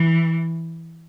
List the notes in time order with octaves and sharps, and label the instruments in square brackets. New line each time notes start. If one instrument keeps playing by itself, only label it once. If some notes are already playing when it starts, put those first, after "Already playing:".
Already playing: [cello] E3